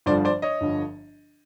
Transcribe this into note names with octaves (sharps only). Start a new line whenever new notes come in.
G1 G2 D3 F3 C5 D5
C5 D5
C#5 D#5
G1 G2 D3 F3